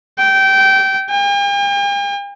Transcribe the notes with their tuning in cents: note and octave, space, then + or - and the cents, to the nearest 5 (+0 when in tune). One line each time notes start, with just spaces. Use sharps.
G5 -20
G5 +45